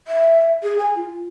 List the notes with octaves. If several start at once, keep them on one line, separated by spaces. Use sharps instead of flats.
E5
G#4
G#5
F4